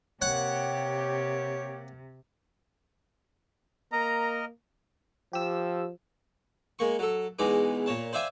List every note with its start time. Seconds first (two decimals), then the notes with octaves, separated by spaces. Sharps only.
0.22 C3 A#3 G4 C#5 F#5
3.92 A#3 A#4 D#5 A#5
5.33 F3 G4 E6
6.79 G#3 A#3 C#6
6.99 F#3 A4
7.39 E2 B2 E3 G#3 D#4 D6
7.86 A#2 C#5 A5
8.13 C5 D5 E5 F5 G5 G#5